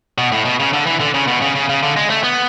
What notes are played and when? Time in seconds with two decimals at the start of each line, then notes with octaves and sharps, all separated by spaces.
0.18 B2
0.32 A2
0.45 B2
0.60 C#3
0.73 D3
0.87 E3
1.00 D3
1.14 C#3
1.28 B2
1.42 C#3
1.55 C#3
1.69 C#3
1.83 D3
1.97 G#3
2.10 A3
2.24 B3